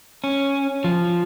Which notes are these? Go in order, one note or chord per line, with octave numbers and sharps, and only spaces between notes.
C#4
F3